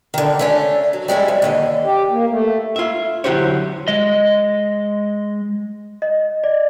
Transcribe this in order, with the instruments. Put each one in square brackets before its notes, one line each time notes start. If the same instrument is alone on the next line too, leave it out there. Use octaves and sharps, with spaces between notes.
[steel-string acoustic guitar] D3 D#3
A3 C#4 D4
F#3
G3 G#3 C#4 E4
F2
D#2 D3 D#5
[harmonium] G4
A#3
A3
[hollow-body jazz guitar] F4 E5
D3 F#3 E4 G4 C5 C#5
[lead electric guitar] G#3 D#5
[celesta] D#5
D5